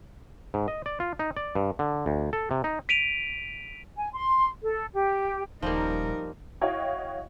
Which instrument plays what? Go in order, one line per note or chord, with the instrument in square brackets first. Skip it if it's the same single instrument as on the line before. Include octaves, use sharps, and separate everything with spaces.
[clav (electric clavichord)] G#2
D#5
D5
F4
D#4
D5
G2
D3
D2
A4
C3
D#4
[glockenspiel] B6 D7 D#7 F7
[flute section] G#5
C6
A4
G4
[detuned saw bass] D#1 [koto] F3 G3 A#3 [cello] D#4 A#4
[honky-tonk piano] E4 F#4 C#5 D#5 F5 G5